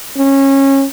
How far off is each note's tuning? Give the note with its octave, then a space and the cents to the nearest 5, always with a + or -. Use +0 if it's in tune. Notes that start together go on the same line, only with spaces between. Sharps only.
C#4 -20